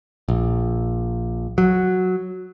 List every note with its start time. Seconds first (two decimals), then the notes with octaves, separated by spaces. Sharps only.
0.28 A#1
1.58 F#3